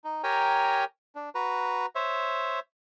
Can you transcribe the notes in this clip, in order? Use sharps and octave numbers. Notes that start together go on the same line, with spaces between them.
D#4
G4 A#4 C#5 G5 G#5 A#5
D4
F#4 B4 A#5
C5 C#5 E5